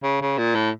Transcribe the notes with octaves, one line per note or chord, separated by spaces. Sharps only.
C#3
C#3
A#2
A2